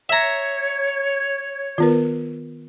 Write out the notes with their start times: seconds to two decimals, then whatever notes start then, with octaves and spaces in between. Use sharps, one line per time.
0.09 C#5 E5 A#5
1.78 D#3 B3 F4 A#4 B4